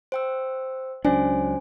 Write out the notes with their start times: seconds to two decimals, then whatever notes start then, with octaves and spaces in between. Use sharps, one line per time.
0.12 C5 G5 E6
1.05 C#2 F#3 C#4 D4 C5 G#5